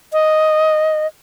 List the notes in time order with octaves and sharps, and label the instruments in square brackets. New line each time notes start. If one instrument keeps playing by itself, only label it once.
[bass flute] D#5